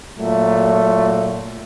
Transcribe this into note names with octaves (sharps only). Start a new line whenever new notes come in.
A#2 F#3 A3